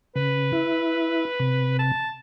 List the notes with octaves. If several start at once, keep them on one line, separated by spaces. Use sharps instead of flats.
C#3 B4
E4
C3
A5